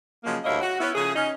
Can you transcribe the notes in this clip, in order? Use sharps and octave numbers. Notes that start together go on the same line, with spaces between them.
C#3 F3 F#3 G#3 A#3
D2 G2 A#3 E4 C#5 D#5
F#4
B3 C#4 E4
C#3 F3 A3 G#4
C#4 D#4